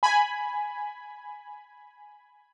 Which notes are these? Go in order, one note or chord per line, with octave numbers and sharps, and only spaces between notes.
G#5 B5